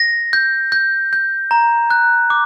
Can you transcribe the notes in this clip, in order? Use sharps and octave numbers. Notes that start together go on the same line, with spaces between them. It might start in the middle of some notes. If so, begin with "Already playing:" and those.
Already playing: A#6
G6
G6
G6
A#5
F#6
D6